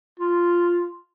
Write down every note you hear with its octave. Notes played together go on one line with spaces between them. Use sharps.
F4